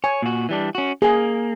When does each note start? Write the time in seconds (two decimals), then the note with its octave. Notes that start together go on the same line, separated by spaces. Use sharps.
0.04 C#5 G#5
0.22 A#2 F#4
0.49 E3 G3 D4
0.75 C#4 F#4
1.02 A#3 G#4 G#5